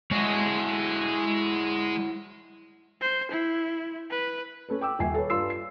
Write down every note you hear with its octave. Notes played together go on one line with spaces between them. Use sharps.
G#3 E4 F#4 C#5 D#5
C5
E4
B4
C#4 A4 B4
G5 D6 E6
D#1 E5 G#5 C7
A4 B4 C#5
G2 F4 C6 E6 C7
C7